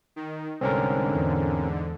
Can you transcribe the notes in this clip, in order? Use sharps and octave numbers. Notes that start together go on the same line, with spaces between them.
D#3
C2 G#2 D3 C4 C#4 A#4
E2